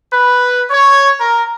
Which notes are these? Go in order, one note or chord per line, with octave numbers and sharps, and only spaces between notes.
B4
C#5
A#4